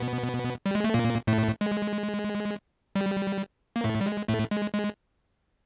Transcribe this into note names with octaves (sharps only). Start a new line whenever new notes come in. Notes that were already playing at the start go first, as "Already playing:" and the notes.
Already playing: B2 B3
G3
G#3
A3
A#2 A#3
A2 A3
G#3
G3
A#3
A2 A3
G3
G#3
A2 A3
G#3
G#3